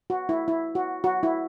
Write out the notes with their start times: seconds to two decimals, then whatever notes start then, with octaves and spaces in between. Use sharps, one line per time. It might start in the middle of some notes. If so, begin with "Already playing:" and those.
0.10 F#4
0.29 E4
0.48 E4
0.75 F#4
1.04 F#4
1.23 E4